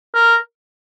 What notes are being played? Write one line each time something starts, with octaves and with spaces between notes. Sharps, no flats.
A#4